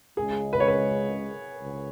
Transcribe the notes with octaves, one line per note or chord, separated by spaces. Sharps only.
C#2 C#3 G#3 G#4
B4
C#5
B4
C#2